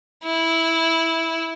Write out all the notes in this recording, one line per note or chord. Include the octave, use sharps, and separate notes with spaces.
E4